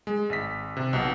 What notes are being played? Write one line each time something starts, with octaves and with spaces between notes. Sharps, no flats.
G#3
G#1 B6
C3
B1 B2